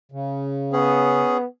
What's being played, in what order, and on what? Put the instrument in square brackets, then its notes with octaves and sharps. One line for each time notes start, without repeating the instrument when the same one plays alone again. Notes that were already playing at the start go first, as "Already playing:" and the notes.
[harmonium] C#3
[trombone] B3 [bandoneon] C#4 G#4